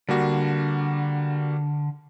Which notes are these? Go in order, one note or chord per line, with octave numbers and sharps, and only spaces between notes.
D3 G3 A#3 F#4